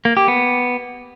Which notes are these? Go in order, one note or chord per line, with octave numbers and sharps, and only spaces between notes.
A#3
G4
B3